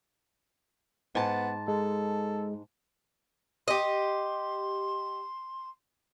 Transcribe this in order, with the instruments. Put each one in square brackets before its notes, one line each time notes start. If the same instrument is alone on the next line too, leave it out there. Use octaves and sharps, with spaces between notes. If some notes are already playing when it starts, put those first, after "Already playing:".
[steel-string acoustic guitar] G#2 A5 [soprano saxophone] B3
[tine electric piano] G#3 [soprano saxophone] A4
[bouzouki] G4 D#5 [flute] C6